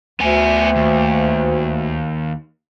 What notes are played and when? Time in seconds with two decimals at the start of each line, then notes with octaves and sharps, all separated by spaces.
0.20 D2 B3 G#5
0.76 D#2